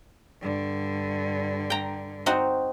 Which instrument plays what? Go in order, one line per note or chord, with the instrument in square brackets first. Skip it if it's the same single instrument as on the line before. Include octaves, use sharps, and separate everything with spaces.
[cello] G2 D3
[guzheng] G5 A#5
C4 D#4 F#4